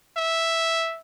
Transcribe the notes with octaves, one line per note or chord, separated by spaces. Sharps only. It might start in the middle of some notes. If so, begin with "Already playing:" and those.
E5